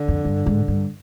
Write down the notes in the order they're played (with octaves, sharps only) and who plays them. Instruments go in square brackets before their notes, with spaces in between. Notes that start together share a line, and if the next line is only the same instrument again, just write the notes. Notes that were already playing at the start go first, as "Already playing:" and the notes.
Already playing: [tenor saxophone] D3
[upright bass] F2
G2
G#2
G2